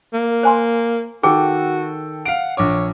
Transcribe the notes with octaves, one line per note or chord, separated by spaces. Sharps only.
A#3
C5 G#5 C6
D#3 F#4 G#4 A4 G5
F5 F#5 D7
A#1 C#5 D6